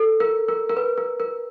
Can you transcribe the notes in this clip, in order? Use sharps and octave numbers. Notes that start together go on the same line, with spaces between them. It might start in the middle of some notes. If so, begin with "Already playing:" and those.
Already playing: A4
A#4
A#4
A#4
B4
A#4
A#4